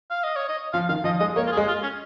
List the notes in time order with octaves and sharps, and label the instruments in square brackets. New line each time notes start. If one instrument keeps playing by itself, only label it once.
[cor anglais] F5
D#5
C#5
D#5
[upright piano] F3 [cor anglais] F5
[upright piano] D#3 [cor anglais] F5
[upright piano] F3 [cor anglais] D#5
[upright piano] G#3 [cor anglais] D#5
[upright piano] A#3 [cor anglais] C#5
[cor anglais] F4
G#4
[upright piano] G#3
[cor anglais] F4
C#4